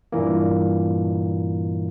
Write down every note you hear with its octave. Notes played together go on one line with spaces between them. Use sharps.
G2 A#2 E3 A#3